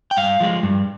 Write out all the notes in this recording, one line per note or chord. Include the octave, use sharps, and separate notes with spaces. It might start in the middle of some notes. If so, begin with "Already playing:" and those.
G5
G2 F5
F3 G#3
G2